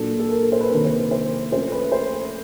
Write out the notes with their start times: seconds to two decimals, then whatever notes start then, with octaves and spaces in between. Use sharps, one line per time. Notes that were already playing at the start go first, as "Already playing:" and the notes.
Already playing: A#2 F#3 A#3 D4 A4
0.19 A4
0.31 A#4
0.52 C5
0.61 B4
0.71 C3 D#3 F#3 A#3 D4 A#4
0.85 C5
0.91 B4
1.11 C5
1.51 F3 A3 C#4 C5
1.72 B4
1.92 C5